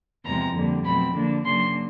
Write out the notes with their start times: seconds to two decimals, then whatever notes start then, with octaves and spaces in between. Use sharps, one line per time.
0.25 E2 C3 F3 G#3 C4 A#5
0.55 F2 D3 G3 A#3
0.85 B2 F#3 A3 C4 B5
1.15 D3 F3 A#3 D4
1.45 C#3 F#3 A#3 D4 C6